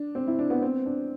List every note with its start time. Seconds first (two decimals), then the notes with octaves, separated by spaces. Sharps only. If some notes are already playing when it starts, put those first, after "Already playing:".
Already playing: D4
0.15 C4
0.27 E4
0.39 D4
0.50 B3
0.62 C4
0.86 D4